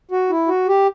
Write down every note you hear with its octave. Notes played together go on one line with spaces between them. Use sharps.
F#4
E4
F#4
G4